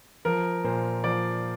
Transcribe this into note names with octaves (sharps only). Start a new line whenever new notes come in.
F3 A#4
A#2 C5
F3 D5